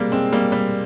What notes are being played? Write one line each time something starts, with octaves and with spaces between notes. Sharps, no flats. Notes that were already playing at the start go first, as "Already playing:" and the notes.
Already playing: G3 G#3 A#3 C4
G#3 C4
G3 A#3
G3